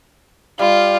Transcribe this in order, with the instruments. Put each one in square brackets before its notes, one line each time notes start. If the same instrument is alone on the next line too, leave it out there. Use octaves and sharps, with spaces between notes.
[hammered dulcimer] G3 [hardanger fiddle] F4